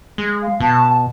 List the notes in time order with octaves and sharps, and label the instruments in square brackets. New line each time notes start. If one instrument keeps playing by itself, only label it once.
[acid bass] G#3
[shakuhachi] F5
[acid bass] B2 [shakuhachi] A5